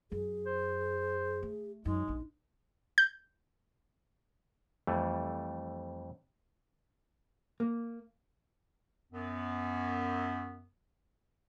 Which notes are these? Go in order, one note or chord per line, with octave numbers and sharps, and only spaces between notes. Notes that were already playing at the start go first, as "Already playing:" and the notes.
F#2 G#4
C5
A3
F#2 G#3 D#4
A#1 G2
G6
F2 E3 G3 A3
A#3
F#2 B3